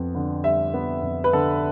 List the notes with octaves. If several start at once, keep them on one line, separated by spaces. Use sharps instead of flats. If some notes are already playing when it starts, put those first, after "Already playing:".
Already playing: F2 B3
D3
G3 E5
B3
F2
B4
D3 A4